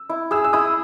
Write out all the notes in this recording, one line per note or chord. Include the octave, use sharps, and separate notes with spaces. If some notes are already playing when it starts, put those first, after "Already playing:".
Already playing: E6
E4
G#4 E6
E6
E4 D#6